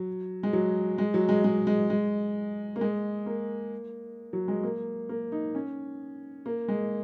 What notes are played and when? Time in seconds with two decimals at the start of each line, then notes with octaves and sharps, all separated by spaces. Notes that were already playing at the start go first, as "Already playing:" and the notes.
Already playing: F#3
0.43 G#3
0.53 F#3
0.98 G#3
1.14 F#3
1.29 G#3
1.44 G#3
1.67 G#3
1.90 G#3
2.76 A#3
2.81 G#3
3.26 A#3
4.33 F#3
4.48 G#3
4.63 A#3
5.09 A#3
5.32 D#4
5.55 C#4
6.46 A#3
6.68 G#3